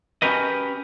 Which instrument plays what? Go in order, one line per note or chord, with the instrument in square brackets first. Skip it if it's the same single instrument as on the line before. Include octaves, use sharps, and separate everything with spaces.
[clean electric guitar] C#4 F#4 G4 A#4 B4 D#5